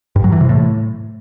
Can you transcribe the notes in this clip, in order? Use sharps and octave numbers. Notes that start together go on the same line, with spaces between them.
G2
F#3
E3
C3
A2